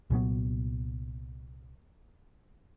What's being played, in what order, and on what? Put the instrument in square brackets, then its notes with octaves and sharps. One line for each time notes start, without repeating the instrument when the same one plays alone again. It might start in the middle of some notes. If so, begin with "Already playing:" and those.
[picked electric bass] C2 A#2 F#3 B3